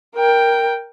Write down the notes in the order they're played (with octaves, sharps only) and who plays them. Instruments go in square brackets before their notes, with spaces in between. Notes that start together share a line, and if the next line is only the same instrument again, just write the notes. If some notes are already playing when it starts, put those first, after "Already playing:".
[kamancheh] A#4 G5